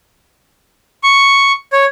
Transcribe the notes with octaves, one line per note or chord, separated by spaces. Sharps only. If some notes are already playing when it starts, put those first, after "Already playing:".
C#6
C#5